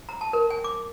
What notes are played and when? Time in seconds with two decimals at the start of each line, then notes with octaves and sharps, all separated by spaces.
0.09 A#5
0.21 A5
0.33 A#4
0.50 G#5
0.64 D6